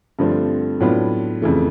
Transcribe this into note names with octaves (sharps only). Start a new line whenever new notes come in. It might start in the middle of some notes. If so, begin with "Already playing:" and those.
G2 D3 F3 A3 C4
A2 F#3 B3 D4 F4
F2 C#3 E3 A3